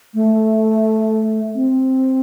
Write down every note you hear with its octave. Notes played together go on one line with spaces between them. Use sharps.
A3
C4